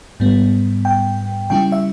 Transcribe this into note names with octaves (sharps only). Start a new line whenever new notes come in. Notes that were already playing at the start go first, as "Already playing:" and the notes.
G#2 G3 B3
G5
C#3 G3 C#4 E4 G5
E5